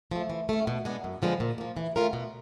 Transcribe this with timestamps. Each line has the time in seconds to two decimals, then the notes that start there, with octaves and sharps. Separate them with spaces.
0.11 F3 A3
0.30 E3
0.49 A3 C#4
0.67 B2
0.85 G#3 B3 D4
1.04 F#2
1.22 D3 F3 G#3 B3
1.40 A#2
1.58 F3 A#3
1.77 E3
1.96 A3 C#4 F4 A#4
2.13 B2